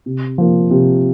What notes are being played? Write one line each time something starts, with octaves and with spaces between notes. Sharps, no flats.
C3
F3 A#3
C3